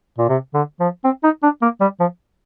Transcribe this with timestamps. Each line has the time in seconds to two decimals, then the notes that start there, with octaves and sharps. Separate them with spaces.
0.19 A#2
0.29 C3
0.54 D3
0.80 F3
1.04 C4
1.24 D#4
1.43 D4
1.62 A#3
1.81 G3
2.00 F3